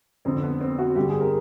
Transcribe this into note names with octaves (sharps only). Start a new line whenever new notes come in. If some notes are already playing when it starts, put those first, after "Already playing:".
F2 D3 C4
B3
C4
F#4
G2 D3 G4
G#4
A#4